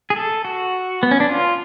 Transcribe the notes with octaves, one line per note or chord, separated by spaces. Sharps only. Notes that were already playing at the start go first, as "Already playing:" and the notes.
G#4
A4
F#4
B3
C#4
D4
F4